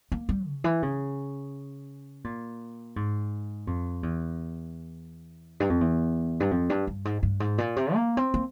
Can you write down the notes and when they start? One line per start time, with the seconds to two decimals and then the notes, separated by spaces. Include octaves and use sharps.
0.12 A#3
0.29 G3
0.47 C#3
0.64 E3
0.82 C#3
2.24 A#2
2.96 G#2
3.67 F2
4.03 E2
5.60 G2
5.70 F2
5.81 E2
6.40 G2
6.51 F2
6.70 G2
6.87 G2
7.05 G#2
7.23 G2
7.40 G#2
7.58 A#2
7.76 C3
7.94 A#3
8.17 C4
8.34 A#3